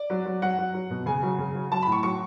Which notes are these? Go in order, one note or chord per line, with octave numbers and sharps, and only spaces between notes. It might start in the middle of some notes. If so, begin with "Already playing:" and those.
Already playing: D5
F#3
F#3
F#3 F#5
F#3
F#3
B2
C#3 G#5
F#3
C#3
F#3
F#3 A5
A2 B5
C#6
F#3 C#6